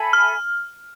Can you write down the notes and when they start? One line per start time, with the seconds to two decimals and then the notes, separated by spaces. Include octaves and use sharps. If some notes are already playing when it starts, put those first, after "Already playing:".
Already playing: A4 E5 G#5 B5
0.13 F6